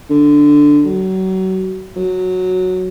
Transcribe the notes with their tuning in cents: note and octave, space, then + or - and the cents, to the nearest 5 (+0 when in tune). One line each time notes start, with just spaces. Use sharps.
D3 +0
F#3 +30
F#3 -5